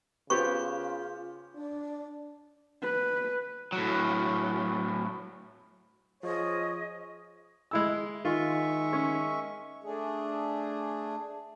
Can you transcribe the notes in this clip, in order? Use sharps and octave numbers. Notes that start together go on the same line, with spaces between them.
C#3 B3 F4 G4 C5 C#6
D4 D5
B4
A2 F#3
F3 G#4 C#5 D#5
G#3 E4 E6
D#3 G#3 F4 E5 C#6
C#4
A3 D4 G#4